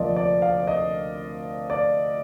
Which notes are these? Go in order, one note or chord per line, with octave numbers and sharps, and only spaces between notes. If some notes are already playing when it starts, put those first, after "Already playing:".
Already playing: D2 C3 F3 A#3 D5 D#5
D5
F5
D#5
D5